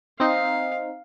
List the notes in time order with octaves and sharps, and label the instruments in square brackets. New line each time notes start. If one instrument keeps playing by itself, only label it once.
[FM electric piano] C4 D#4 [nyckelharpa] F5